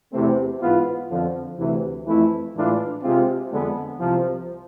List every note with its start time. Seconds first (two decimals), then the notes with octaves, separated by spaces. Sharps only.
0.12 E2 C3 E3 A3 C4
0.61 G#2 E3 B3 F4
1.09 F2 D3 F3
1.58 D2 C3 E3
2.06 F2 E3 A3 E4
2.54 A2 E3 G#3 D4 F4
3.03 C3 G#3 C4 F4
3.51 F2 D3 G#3 B3
4.00 C2 C3 F3